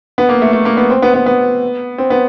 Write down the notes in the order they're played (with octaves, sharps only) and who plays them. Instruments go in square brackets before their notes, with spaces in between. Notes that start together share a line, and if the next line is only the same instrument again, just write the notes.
[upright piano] B3
A#3
A3
A3
A#3
B3
C4
B3
B3
B3
C4
B3